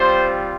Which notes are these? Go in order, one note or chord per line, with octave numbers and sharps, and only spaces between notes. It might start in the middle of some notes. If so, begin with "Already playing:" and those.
Already playing: G3 C4 F4 C5